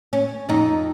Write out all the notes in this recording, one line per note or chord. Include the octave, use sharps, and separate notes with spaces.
C#4
F2 D#4